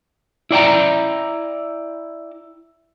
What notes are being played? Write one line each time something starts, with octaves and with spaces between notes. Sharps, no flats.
E4 D5 G5 A#5